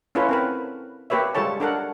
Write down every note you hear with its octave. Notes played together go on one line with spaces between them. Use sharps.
C#4 E4 F4 A4 B4 C#5
C4 A#4 B4
A#3 G4 B4 C#5 E5
G3 G#3 F4 A4 C#5 A5
D4 A4 A#4 F#5